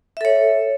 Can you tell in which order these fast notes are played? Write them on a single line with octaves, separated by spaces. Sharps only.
E5 A4 C#5